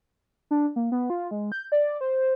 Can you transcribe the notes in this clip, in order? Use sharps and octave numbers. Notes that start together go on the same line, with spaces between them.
D4
A#3
B3
F4
G#3
G6
D5
C5